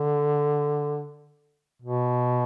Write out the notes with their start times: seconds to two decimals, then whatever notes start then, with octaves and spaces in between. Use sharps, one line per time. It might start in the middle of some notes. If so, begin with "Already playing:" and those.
Already playing: D3
1.82 B2